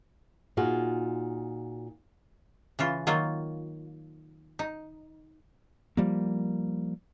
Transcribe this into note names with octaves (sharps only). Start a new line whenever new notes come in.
A#2 D#4 F4 F#4 G#4
C#3 E3 F4
D#3 F#3 A#3 F4
D#4
F3 G3 A#3